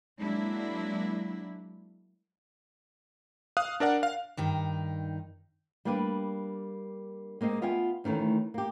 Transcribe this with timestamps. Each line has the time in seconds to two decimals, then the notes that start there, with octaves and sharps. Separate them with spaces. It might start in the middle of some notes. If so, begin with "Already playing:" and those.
0.20 F#3 G#3 A#3 D4 E4
3.57 F5 D#6 F#6
3.80 D4 A#4 D5 F#5
4.03 F5
4.37 G2 D#3 D#4
5.85 G3 A#3 D4 G4 B4
7.41 G#3 A#3 C4 D#5
7.62 B3 F4 E5 G5 G#5
8.04 D2 D#3 E3 A3 C#4
8.54 A#3 G4